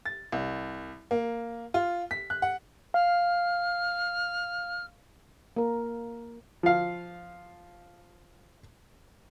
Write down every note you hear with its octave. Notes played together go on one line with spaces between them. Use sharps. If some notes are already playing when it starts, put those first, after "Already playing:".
A6
C2
A#3
F4
B6
F#6
F#5
F5 F6
A#3 A#4
F3 F5